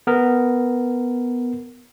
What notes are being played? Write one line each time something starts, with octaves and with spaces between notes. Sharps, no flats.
B3 A#4